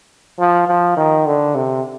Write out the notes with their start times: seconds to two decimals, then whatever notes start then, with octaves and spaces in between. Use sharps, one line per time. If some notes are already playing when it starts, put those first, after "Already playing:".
0.40 F3
0.68 F3
0.97 D#3
1.26 D3
1.55 C3